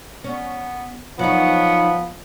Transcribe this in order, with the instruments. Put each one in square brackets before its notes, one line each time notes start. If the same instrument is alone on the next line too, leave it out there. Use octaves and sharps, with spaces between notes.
[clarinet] B3 [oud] C#4
[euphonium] F3 [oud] F#3 D#4 [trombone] B3 [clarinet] F#5